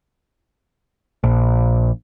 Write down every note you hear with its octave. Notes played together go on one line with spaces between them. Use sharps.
A#1